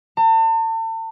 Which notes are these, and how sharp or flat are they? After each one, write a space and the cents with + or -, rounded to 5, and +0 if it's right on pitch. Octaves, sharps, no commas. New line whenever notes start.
A5 +40